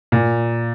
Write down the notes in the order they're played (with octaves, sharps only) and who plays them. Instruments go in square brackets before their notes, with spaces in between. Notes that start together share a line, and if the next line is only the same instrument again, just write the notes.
[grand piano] A#2